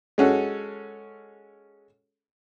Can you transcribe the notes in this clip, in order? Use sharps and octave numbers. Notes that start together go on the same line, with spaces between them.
G#3 C#4 F#4 A4